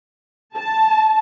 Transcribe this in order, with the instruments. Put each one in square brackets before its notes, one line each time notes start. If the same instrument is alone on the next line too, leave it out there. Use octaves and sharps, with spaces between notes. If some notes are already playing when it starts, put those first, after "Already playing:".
[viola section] A5